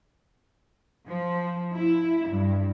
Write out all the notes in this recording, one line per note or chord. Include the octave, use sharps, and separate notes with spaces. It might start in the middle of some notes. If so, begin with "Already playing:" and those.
F3
E4
G2